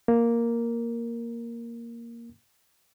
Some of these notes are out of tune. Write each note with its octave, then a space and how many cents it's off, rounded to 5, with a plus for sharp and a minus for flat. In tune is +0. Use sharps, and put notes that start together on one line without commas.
A#3 +0 A#4 +0